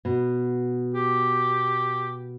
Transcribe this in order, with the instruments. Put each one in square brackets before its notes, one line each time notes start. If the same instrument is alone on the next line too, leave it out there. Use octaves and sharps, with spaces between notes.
[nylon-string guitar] B2
[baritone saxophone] G4